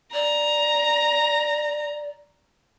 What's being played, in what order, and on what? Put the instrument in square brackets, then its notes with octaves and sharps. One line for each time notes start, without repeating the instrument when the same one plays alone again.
[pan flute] D5 [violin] A#5